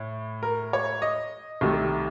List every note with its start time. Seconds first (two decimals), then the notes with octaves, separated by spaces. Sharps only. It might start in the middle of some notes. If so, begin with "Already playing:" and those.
Already playing: A2
0.43 A#4
0.73 C#5
1.02 D#5
1.61 C2 C3 D#3 A3